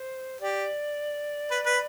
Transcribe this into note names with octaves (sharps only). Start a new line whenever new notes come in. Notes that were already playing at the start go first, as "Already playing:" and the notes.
Already playing: C5
G4 D5
B4
B4